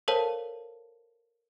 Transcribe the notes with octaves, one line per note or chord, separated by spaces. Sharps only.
A4 A#4 C5 C#5 F5 A5